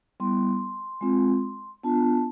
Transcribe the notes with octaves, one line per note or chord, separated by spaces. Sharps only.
G3 B3 E4 C6
G#3 C4 F4
B3 D4 F4 A5